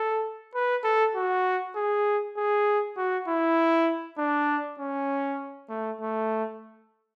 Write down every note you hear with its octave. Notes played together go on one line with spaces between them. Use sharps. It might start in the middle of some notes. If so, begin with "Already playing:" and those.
Already playing: A4
B4
A4
F#4
G#4
G#4
F#4
E4
D4
C#4
A3
A3